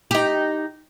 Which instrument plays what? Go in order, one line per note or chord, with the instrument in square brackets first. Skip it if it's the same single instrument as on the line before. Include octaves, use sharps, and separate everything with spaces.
[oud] D#4 G4